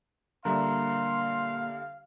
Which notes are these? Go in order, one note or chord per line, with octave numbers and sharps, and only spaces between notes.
A#2 D3 G3 A#4 E5 F5 C6